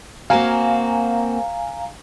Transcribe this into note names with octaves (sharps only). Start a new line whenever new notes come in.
A#3 C4 F#4 F5 G#5 A#5